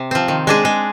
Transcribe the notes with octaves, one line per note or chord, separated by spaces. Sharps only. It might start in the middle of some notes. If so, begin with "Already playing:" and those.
Already playing: C3
F3 C4
D#3
G#3 D4 G#4
G#3